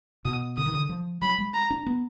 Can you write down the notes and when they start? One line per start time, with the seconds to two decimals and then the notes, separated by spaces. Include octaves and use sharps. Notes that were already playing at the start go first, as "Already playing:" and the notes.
0.25 B2 D#6
0.57 D3 D#6
0.66 D#3
0.74 D3
0.89 F3
1.22 F#3 B5
1.38 G#3
1.54 A#5
1.70 D4
1.86 B3